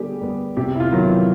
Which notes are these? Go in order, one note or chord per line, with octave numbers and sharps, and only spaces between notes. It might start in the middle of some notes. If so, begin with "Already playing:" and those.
Already playing: D3 G3 B3 G4 G#4
G3 B3
C3 G4
E4
F4
D#3 F#3 B3
E4